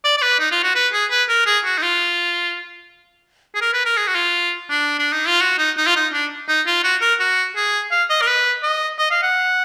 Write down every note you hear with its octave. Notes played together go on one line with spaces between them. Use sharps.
D5
D5
B4
D#4
F4
F#4
B4
G#4
B4
A#4
G#4
F#4
D#4
F4
G#4
A#4
B4
A#4
G#4
F#4
F4
D4
D4
D#4
F4
F#4
D#4
D#4
F4
D#4
D4
D#4
F4
F#4
A#4
F#4
G#4
F5
D#5
A#4
B4
D#5
D#5
F5
F#5